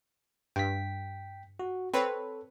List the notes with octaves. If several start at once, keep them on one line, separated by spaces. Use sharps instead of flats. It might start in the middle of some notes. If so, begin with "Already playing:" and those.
G2 G5 B6
F#4
C4 A4 B4 C#5